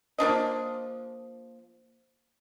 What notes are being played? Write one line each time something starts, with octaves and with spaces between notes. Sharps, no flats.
F3 A#3 D4 D#5